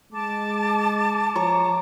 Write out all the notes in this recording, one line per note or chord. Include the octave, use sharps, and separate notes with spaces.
G#3 A5 D6
F3 C#5 A#5 C#6